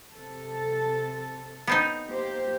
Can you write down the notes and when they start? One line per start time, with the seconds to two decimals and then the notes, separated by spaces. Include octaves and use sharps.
0.14 C3 A4
1.67 B3 C4 D#4
2.08 A#3 G4 C5